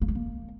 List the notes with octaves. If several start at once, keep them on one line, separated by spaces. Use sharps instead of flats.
A#3
G#3
A#3